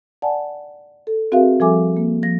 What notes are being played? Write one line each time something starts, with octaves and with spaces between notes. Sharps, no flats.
D5 F#5 G#5 A5
A4
C4 F#4 G#4 A#4 E5 F5
F3 G3 A4 E5 G#5 D6
A#3
F3 A#6